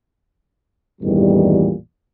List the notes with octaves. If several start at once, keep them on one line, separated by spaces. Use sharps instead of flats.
A1 E2 G2 A#2 D#3 G3